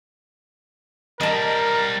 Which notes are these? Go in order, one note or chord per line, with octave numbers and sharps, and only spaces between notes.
G3 C4 A#4 D#5 A5